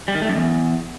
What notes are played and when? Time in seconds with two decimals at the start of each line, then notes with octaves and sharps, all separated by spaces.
0.08 G3
0.15 D#3
0.22 A3
0.29 F#2
0.36 E2